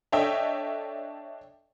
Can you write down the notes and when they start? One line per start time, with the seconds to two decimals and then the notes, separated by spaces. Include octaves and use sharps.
0.12 D4 A4 C#5 D#5 E5 G5